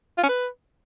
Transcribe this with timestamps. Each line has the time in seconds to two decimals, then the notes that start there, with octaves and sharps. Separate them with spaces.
0.18 F4
0.23 C#4
0.29 B4